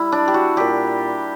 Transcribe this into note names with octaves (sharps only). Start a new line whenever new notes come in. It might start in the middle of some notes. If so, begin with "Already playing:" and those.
Already playing: G3 E4
D4
G4
F#4
A#2 G3 G4